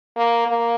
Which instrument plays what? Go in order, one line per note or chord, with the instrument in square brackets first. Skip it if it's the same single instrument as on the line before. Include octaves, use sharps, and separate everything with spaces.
[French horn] A#3
A#3